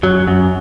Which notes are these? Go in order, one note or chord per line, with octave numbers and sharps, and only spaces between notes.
F#2 F#3
F#2